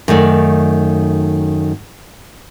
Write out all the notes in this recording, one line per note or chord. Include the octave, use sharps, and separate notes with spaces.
F#2 D#3 A3 D5